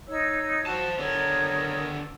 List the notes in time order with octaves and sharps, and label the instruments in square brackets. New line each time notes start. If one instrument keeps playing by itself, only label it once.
[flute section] D#4 C#5 E6
[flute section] F#4 [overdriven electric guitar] C5 A5
[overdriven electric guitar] D3 B3 [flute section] A#4 C#5 D#6